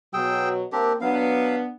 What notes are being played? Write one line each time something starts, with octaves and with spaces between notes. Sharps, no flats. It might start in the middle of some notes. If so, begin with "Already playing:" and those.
B2 F#3 G#4 G5 E6
A#3 C4 D4 G4 A#4
F#3 B3 D4 F5